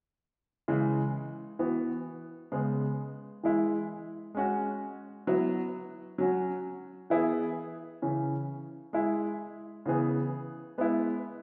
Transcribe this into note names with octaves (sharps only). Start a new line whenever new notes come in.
C#3 E3 G#3
E3 B3 F#4
C#3 G#3 B3
E3 G#3 E4
G#3 C#4 F#4
F#3 B3 E4
F#3 C#4 F#4
E3 B3 E4 G#4
C#3 E3 C#4
G#3 E4 G#4
C#3 E3 B3 G#4
G#3 B3 E4